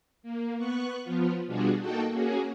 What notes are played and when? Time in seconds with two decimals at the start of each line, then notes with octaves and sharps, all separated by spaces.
0.23 A#3
0.57 B3 C#6 F#6
1.04 F3 B3 F4
1.46 B2 G3 D4 F4 F#4 G#4
1.80 A#3 D#4 F#4 A4 G5 A5
2.11 A#3 C#4 F#4 G#4